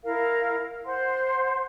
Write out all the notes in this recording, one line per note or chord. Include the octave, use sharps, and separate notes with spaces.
E4 A#4 F5
C5 F#5 C6